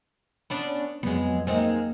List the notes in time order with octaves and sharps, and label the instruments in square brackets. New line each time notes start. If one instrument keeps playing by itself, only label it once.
[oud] B3 C#4 D4
[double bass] F2 F#3 [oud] G#3 B3
[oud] G#3 C4 D#4 [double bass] A#3